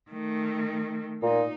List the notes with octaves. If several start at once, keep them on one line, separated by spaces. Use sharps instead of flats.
D#3 A3
A#2 D#4